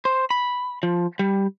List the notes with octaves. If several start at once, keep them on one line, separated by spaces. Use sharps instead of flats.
C5
B5
F3
G3